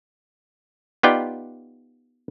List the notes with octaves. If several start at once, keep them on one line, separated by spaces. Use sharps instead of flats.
B3 D#4 F4 G4 D5 G5